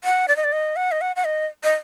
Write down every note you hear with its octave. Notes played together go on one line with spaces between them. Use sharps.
F#5
D5
D#5
D5
D#5
F#5
D#5
F#5
F#5
D#5
D#5